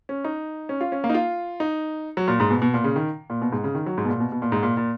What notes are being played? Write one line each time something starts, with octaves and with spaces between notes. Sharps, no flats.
C#4
D#4
C#4
F4
C#4
A#3
D#4
F4
D#4
F#3
A#2
G#2
B2
B2
A#2
C#3
D#3
A#2
B2
G#2
C#3
D#3
F#3
G#2
B2
A#2
B2
B2
A#2
G#2
A#2
A#2